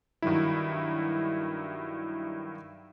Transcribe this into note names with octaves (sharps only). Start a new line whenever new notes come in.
G2 D#3 F#3 E4